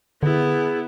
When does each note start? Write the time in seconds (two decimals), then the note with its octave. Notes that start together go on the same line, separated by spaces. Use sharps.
0.23 D3 B3 E4 G#4